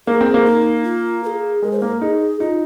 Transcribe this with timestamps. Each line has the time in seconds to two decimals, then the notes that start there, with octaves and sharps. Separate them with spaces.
0.07 A#3 G#4
0.21 C4
0.34 A#3
0.45 D#4
0.84 F4
1.24 A#4
1.27 G#4
1.62 G#3 A#4
1.72 C5
1.80 A#3 A#4
2.01 D#4 G#4
2.40 D#4 F4